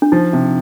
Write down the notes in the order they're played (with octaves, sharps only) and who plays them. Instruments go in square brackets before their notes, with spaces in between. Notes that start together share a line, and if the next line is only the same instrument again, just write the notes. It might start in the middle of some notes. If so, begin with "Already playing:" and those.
[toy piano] D4
[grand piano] F3 [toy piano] D#4
[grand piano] C3